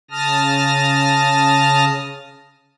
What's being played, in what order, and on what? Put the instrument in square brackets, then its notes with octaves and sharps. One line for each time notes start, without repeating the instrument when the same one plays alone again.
[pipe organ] C#3 A5 D#6 F6 A#6